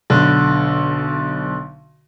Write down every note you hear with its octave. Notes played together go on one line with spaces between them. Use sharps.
B1 D3